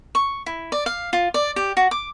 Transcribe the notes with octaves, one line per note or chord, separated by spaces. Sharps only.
C#6
E4
D5
F5
F4
D5
G4
F#4
D6